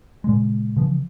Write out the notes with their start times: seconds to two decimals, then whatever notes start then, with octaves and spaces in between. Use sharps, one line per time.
0.24 A#2 C#3 G#3
0.77 C#3 E3 F3